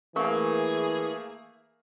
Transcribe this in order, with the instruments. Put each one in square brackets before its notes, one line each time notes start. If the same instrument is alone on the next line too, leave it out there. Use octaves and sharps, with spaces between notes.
[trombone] E3 [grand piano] A3 A#3 [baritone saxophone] G#4 [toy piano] A#4 F5 C#6